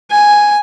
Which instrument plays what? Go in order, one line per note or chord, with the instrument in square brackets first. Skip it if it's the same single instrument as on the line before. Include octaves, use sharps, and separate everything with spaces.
[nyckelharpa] G#5